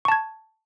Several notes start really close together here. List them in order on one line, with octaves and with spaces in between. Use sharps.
C#6 A5 G#6